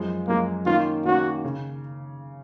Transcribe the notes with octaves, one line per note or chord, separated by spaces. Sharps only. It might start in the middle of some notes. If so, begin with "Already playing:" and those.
Already playing: F#2 F3 G#3
F#2 F3 G#3 A#3
D#3 A#3 C#4 F4
D#3 A#3 C#4 F#4
C#3